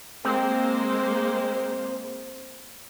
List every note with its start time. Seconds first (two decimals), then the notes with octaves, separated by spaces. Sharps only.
0.25 G#3 A#3 C4 C5